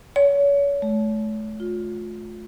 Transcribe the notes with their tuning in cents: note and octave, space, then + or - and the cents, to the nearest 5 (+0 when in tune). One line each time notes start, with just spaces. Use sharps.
C#5 +35
A3 -35
F4 +25